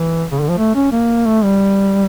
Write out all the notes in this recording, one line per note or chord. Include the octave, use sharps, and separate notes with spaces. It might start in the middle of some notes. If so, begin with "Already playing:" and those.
Already playing: E3
C#3
D3
F3
A3
C#4
A#3
A3
G3